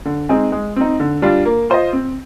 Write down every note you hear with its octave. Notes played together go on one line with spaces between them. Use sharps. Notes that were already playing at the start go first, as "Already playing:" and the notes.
D3
G#3 C4 D#4 G#4
G#3
C4 D#4
D3
G3 D4 F4
A#3
F4 C5 D#5
C4